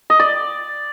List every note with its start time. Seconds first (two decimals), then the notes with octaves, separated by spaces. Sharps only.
0.10 D#5
0.20 D5